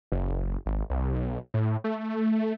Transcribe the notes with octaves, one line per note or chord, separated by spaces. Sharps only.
F#1
G#1
C2
B1
A2
A3